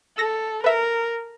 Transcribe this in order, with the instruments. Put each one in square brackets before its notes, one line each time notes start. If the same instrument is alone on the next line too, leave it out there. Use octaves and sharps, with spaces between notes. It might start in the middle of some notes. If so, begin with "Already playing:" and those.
[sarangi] A4 [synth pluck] E6 A#6
[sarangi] A#4 [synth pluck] B4 E5